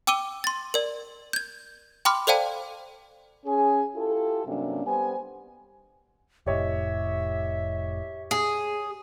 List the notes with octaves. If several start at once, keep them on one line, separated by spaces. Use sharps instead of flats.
G5 D6 E6 D#7 G7
C6 A6
A#4 D5
G6 G#6
G5 B5 C6 D6 F6
A4 C5 D5 F5 G5 A5
C#4 G#4 G#5
E4 F4 G4 A4
G2 C3 F#3 A#3 C#4 D4
G3 B3 G4 C5 G#5
F1 A2 G4 C#5 D#5 E5
G#4